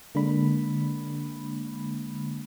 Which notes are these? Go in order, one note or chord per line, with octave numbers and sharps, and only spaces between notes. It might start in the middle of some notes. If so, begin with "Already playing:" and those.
D3 G#3 A#3 D4 B5